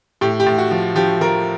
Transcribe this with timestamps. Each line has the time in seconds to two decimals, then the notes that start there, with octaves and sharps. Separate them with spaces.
0.21 A2 G4
0.40 G4
0.46 A2
0.58 F#4
0.71 F3
0.95 F3 G4
1.21 F3 A#4